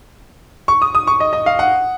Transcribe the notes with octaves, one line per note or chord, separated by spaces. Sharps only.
C#6
D#6
D#6
C#6
D#5
D#5
F5
F#5